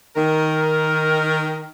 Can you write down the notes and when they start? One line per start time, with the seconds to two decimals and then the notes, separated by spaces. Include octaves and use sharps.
0.16 D#3 A#4